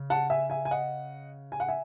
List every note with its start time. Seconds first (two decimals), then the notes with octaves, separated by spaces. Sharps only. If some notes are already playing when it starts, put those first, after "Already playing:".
Already playing: C#3
0.10 F#5 A5
0.30 E5 G#5
0.50 E5 G#5
0.65 G#5
0.71 D#5 F#5
1.52 G#5
1.60 F#5
1.68 E5 G#5